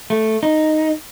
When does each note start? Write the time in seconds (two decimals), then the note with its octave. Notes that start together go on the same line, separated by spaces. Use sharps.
0.10 A3
0.43 D#4